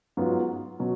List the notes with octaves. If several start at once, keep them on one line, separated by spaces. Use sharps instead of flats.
G#2 F#3 B3 F4
B2 F#3